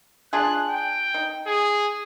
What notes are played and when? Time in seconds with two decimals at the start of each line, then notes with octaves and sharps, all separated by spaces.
0.33 D4 F4 G#4 F#6
0.69 G5
1.14 D#4
1.47 G#4